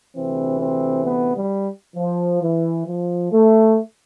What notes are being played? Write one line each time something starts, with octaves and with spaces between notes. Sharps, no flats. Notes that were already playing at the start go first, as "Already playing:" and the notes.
D2 C3 E3 C4
C4
B3
G3
F3
E3
F3
A3